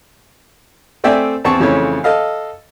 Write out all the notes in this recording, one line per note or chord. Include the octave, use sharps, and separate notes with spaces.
A3 C4 D5 E5 G5 G#5
E2 C4 A5 C#6
F2 C#3 E3 A3 C#5
A4 D#5 F5